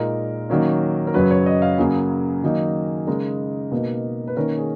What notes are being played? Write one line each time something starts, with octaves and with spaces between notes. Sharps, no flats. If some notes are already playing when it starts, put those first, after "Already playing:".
Already playing: A#2 G#3 D#4 A#4
D#3 F#3 A#3 C#4
A#4
F#2 C#3 F#3 C#4 B4
C#5
D#5
F5
F#2 C#3 F#3 A#3 G#4
D#3 F#3 A#3 D#4
C#3 G#3 D#4 A#4
B2 A#3 D#4
B4
D#3 A#3 C#4 A#4
G#4